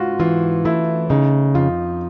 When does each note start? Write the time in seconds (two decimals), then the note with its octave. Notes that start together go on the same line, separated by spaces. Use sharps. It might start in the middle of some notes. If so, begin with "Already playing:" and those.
Already playing: G#2 F4 F#4
0.20 E3 F4
0.65 A3 E4
1.10 C#3 D#4
1.55 F2 F4